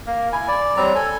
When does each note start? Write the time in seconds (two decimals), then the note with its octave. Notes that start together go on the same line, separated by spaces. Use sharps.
0.06 A#3
0.32 E4 G#5
0.48 D5
0.77 F#3 G3 C4 A#5
0.95 A4 G#5